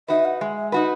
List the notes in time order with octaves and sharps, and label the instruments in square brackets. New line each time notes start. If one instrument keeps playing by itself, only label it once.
[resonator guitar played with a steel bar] D#4 F#4 B4 [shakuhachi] E5
[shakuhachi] F#5
[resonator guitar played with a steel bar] G#3 [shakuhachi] E5
[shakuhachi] E5
[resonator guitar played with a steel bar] D#4 F#4 B4 [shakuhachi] F#5